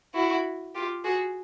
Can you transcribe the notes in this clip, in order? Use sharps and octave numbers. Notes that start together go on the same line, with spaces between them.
E4 F#4
F4 G4
F#4 G#4